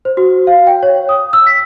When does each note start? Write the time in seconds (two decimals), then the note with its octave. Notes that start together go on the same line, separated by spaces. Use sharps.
0.05 C5
0.17 F#4
0.47 F5
0.67 G5
0.83 C#5
1.09 D#6
1.33 E6
1.47 B6